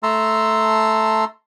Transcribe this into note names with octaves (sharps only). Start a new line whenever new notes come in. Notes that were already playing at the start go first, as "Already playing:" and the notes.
A3 A5 A#5 C6 E6